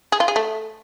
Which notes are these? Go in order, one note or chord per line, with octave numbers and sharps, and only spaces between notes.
G#4
F4
G#4
A3